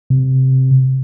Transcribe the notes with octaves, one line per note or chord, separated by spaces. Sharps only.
C3